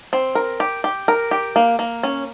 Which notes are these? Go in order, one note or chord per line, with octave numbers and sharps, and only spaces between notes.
C4
A#4
G4
G4
A#4
G4
A#3
A#3
C#4